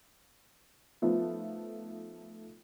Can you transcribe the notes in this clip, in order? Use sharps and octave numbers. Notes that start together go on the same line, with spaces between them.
F3 A3 B3 D#4 F4